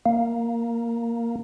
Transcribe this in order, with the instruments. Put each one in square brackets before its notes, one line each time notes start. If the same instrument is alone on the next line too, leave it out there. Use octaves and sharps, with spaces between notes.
[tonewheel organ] A#3